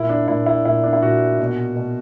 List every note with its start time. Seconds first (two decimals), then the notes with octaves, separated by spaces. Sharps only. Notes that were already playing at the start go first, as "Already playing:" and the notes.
Already playing: A#2 E4
0.09 D4
0.28 A#2 E4
0.46 E4
0.65 A#2 E4
0.84 D4
0.93 E4
1.02 A#2 F#4
1.39 B2
1.76 B2